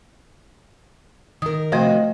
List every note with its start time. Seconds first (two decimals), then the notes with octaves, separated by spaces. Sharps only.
1.42 D#3 A#4 D#6
1.72 C3 F3 A3 C4 F#4 C5 D#5 F5